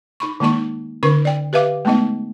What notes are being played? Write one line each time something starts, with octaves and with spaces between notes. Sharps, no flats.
D#4 B5 C#6
D#3 G#3 A#3 D#4 C#6
D3 C#4 D#4 A#4 C#6
D5 G5
G4 B4 E5 F5 D6
G#3 A3 B3 D#4 D#5